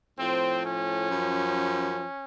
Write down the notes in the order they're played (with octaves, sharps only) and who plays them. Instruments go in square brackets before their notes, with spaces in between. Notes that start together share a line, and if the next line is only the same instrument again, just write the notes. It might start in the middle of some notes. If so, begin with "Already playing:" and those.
[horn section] A2 F3 C4
C#4
F#2 F3